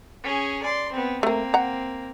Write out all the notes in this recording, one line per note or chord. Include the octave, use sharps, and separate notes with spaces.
C#4 G#4
D5 C6
B3 C4
A3 A#3 C4 A#4
F#5 A#5